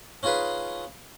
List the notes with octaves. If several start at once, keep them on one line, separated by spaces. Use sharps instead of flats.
C#4 D#4 F4 G#4 B4